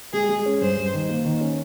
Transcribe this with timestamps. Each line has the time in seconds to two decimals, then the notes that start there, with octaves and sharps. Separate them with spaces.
0.13 G#3 G#4
0.29 G#3
0.46 C#4
0.61 G2 C5
0.77 G2
0.93 D#3
1.09 A#3
1.25 D#3
1.41 C#4